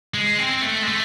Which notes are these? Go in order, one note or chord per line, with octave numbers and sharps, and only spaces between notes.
G#3
C4
A3
G#3
A3